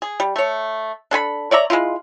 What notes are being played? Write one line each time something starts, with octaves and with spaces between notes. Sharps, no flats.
G#4
G3
A3 C#5
D4 A4 G#5 B5
C#5 D5 E5 A#5
G#3 B3 E4 F4